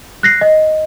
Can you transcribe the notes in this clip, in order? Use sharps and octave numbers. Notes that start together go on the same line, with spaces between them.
F#6 A#6 C7
D#5